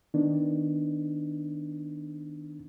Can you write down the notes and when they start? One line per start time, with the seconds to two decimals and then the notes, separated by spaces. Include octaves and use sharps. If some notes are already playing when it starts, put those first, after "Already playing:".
0.14 D#3 B3 D4 D#4